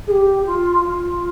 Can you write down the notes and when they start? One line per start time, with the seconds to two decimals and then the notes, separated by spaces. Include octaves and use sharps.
0.07 G#4
0.11 G4
0.45 F4
0.84 F4